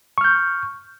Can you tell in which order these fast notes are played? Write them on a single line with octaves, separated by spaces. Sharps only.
C#6 F6 G6